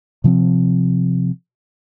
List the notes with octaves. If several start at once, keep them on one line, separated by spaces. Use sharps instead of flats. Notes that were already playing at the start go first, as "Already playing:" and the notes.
C3 F3 C4